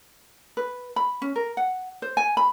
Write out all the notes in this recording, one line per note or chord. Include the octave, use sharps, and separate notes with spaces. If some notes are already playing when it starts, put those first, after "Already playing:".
B4
B5
C#4
A#4
F#5
C5
G#5
B5